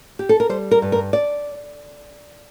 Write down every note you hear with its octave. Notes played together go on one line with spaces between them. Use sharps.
G4
A4
A#4
G3 C5
A#4
G2
A#4
D5